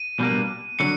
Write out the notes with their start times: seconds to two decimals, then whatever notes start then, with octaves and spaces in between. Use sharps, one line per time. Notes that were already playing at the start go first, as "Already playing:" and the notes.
Already playing: D#7
0.20 B2 G3 A#3 D4
0.79 D3 F#3 C#7